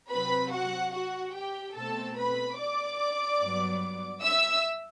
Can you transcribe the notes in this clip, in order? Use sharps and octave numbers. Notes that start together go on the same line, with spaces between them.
C3 F#3 C4 B4 B5
F#4 F#5
F#4 F#5
G4 G5
B2 A3 C4 A4 A5
B4 B5
D5 D6
G2 F#3 B3
E5 E6